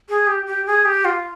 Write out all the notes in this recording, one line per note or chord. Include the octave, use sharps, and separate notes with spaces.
G#4
G4
G4
G#4
G4
F4